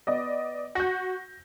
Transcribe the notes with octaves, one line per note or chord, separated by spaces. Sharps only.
B3 D5 D#5
F#4 G6 A#6